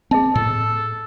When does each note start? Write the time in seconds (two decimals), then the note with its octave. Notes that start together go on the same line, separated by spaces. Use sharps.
0.11 C4 G#4 D#5 A5
0.35 A2 A4